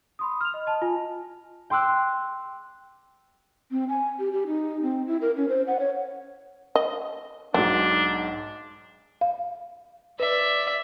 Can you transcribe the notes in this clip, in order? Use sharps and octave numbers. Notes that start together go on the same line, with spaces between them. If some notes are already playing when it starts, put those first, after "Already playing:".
B5 C6 D#6
F6 F7
D#5
D#5 A5
F4 G#5
G5 C6 D6 E6 F#6
C4
G#5
G4
G4
D#4
C4
E4
A#4
C#4
C5
F#5
C#5
D#5
B1 G#2 F#3 D4
F5
B4 D5 E5